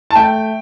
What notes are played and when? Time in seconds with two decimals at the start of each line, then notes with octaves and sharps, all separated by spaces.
0.11 A5
0.15 A3 G5